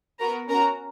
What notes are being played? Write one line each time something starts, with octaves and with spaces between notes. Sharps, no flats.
B3 F#4 A#4 A#5
C#4 F#4 A#4 A#5